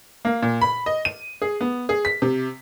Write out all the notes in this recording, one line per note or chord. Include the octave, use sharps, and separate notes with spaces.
A#3
A#2
B5
D#5
D#7
G#4
B3
G#4
B6
C3